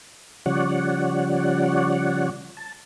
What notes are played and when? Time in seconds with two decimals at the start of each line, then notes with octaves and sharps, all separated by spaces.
0.46 C#3 F3 G3 C#5 D5 F#5
2.57 A5